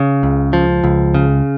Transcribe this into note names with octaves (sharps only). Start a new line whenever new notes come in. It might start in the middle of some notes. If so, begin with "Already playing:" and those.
Already playing: C#3
C#2
F3
C#2
C#3